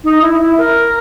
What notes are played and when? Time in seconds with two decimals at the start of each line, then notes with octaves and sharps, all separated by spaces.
0.04 D#4
0.22 E4
0.40 E4
0.58 A#4